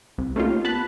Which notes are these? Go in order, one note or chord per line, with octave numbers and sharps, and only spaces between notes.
C2
A3 A#3 C#4 D#4 F4 G4
B3 A5 B5 F#6